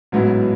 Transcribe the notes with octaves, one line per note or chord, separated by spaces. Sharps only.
A1 G#2 F#3 B3 E4